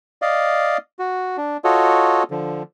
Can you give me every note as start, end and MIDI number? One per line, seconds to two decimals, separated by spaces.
0.22 0.77 74
0.22 0.77 75
0.22 0.77 77
0.99 1.37 66
1.37 1.57 62
1.64 2.23 65
1.64 2.23 66
1.64 2.23 69
1.64 2.23 73
1.64 2.23 75
2.31 2.63 50
2.31 2.63 53